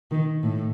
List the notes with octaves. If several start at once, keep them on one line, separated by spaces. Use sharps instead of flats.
D#3
A2